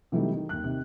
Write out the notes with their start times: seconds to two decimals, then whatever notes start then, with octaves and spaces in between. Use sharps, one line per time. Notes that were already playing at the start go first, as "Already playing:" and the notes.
0.12 C3 E3 F#3 G3 A3 D#4
0.33 D#3 D#4
0.49 D#2 F#6
0.64 C3 D#3